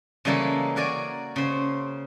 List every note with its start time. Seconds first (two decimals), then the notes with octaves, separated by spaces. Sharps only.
0.25 C#3 E3 G3 G#3 A#3 A4
0.76 F#4 A#4 D5 G#5
1.36 C#3 C5